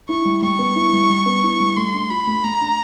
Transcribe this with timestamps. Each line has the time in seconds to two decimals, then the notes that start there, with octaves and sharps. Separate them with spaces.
0.09 E4 C#6
0.25 G3
0.42 G3 C#6
0.59 B3
0.76 E4
0.93 G3
1.10 G3
1.26 B3
1.43 E4
1.60 G3
1.76 A3 C6
1.94 D4
2.10 F4 B5
2.27 A3
2.44 A3 A#5
2.61 D4